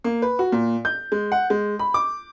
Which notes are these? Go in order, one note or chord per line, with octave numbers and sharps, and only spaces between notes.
A#3
B4
F#4
A#2
G6
G#3
F#5
G#3
B5
D6